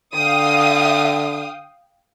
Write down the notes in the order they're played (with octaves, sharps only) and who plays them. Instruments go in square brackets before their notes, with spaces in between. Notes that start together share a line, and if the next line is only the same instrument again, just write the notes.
[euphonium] D3 [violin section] F5 G5 D#6